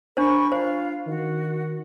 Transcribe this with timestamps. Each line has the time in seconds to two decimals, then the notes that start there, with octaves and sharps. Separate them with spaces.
0.17 D4 A#4 C5 B5 C#6
0.52 F4 C5 F5
1.07 D#3 F#4